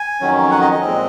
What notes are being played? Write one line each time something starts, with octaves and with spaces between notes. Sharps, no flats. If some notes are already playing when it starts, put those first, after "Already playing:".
Already playing: G#5
F2 D#3 F#3 C#4
F#5
D#5
D#5
A#2 G#3 C4